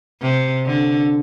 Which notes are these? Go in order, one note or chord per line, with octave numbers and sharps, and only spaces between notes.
C3
D3